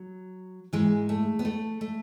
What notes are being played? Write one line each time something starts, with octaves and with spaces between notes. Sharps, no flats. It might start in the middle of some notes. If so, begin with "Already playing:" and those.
Already playing: F#3
G#2 E3 G#3
A3
B3
A3
A3